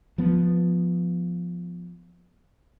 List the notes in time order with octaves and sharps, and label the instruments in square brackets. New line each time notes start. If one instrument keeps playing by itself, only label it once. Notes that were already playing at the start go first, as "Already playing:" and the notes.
[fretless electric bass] F3 B3